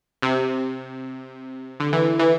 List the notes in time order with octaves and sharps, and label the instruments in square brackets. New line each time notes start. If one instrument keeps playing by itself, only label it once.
[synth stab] C3
D3
E3
E3